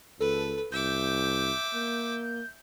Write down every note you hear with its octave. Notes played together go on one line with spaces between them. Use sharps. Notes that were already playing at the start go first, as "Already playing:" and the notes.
C#2 A4 B4
C2 E5 D6 G6
A#3